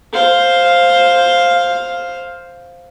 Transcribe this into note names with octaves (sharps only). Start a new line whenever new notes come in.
C5 F5